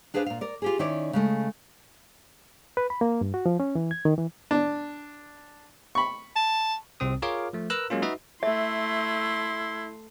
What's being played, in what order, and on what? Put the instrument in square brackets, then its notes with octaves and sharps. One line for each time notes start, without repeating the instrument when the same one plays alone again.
[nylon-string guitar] D4 G#4 B4 C5 F5
A#2 F5
A#4 D5
F4 G4 G#4
D#3 C#4 E4 C#5 D5
C#3 G#3 A3
[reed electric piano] B4
B5
A#3
G2
F#4
F3
C#4
E3
G#6
D#3
E3
[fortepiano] D4
B5 C#6
[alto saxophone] A5
[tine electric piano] C2 C3 C4 D#6
F4 G#4 A#4 C#5 F5 D6
F3 A3
A#4 B4 A#5 E6 F#6
F#3 G#3 A#3 C#4 F4
D#4 F#4 B4 D#5 E5
[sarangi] A3 [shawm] E4 [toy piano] E5 [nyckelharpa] C6